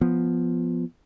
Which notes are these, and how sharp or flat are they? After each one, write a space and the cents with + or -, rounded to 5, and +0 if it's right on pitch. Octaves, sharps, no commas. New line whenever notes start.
F3 +0 B3 +0